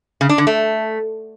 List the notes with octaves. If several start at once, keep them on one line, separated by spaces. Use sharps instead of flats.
C#3
D4
D3
A3